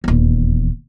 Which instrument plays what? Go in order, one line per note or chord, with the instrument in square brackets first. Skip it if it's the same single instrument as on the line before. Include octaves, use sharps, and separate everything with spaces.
[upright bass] D#1 E2